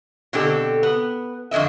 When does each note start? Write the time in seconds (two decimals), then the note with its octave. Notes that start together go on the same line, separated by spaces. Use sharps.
0.33 B2 D3 C4 G4 A4
0.83 B3
1.51 F2 D3 E3 D#5 E5